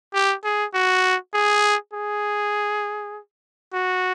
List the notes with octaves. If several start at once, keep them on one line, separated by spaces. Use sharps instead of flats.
G4
G#4
F#4
G#4
G#4
F#4